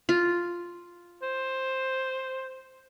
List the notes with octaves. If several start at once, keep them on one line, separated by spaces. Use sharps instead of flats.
F4
C5